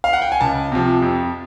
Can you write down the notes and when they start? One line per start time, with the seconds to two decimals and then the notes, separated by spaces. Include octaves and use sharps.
0.04 F5
0.13 F#5
0.22 G5
0.32 G#5
0.41 C#2 A5
0.72 C3 F3
1.02 F2